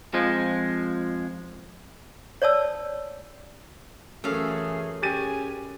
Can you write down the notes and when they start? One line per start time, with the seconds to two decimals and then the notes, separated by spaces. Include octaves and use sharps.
0.14 F2 F3 G#3
2.42 C#5 D5 A5 E6
4.24 F#2 E3 A3 G#4 A4 F5
5.02 C#4 G4 G#4 G#5 A6 D#7